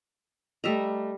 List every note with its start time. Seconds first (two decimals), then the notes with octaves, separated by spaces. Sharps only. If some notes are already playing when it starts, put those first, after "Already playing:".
0.64 G3 A3 D#5 E5 A#5